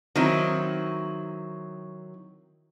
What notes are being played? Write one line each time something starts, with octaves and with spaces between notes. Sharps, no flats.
D#3 F#3 C4 E4